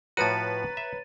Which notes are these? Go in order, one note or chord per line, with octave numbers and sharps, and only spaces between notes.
A2 F3 F#4 B4 C#5 A#5 A6 D#7
E5